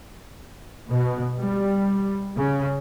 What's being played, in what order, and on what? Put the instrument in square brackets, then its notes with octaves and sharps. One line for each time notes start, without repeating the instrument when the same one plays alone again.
[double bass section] B2
G3
C#3